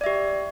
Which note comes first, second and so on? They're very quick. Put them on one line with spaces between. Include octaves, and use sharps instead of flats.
D5 E5 G4